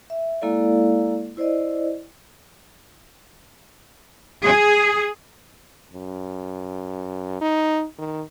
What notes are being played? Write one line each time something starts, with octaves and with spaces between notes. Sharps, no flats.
E5
G#3 A#3 E4 A4 D5 F5
E4 C5 D5 D#5
G#4
F#2
D#4
D#3